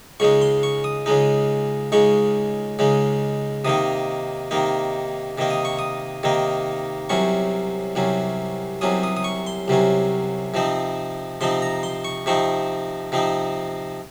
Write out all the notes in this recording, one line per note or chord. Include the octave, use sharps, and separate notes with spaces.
C#2 C#3 G#3 D#4 C#6
C6
C#6
D#6
C#2 C#3 G#3 D#4
C#2 C#3 G#3 D#4 C#6
C#2 C#3 G#3 D#4
C3 D#3 A#3 D#4 D#6
C3 D#3 A#3 D#4
C3 D#3 A#3 D#4
D#6
C#6
D#6
C3 D#3 A#3 D#4
C2 C3 F#3 C#4 C#6
C2 C3 F#3 C#4
C2 C3 F#3 C#4 D#6
D#6
D#6
C#6
C6
C2 C3 F#3 C#4
C3 F3 C4 D#4
C3 F3 C4 D#4 C6
A#5
C6
C#6
C3 F3 C4 D#4 C#6
C3 F3 C4 D#4